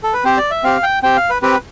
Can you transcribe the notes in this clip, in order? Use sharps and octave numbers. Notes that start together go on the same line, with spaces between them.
A4
B4
C4 G4 C5
D5
E5
C4 G4 F5
G5
C4 G4 G5
F5
B4
C4 G4 B4